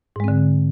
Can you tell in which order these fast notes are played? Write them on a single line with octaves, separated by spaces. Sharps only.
G#2 G#3 C4 D3